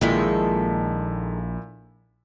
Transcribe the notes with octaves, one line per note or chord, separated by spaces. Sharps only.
A#1 A#2 D#3 G#3 E4 A4 B6